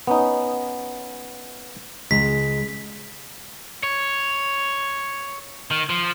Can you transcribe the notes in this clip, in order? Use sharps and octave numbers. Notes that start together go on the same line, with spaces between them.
B3 C#4 D#4
C#2 G#3 B6
C#5
D#3
F3